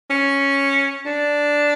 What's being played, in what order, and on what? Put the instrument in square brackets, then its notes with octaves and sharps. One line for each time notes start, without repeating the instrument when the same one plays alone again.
[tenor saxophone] C#4
D4